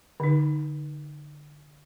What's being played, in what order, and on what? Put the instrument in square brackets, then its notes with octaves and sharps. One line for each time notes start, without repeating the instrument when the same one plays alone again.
[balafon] D3 D#4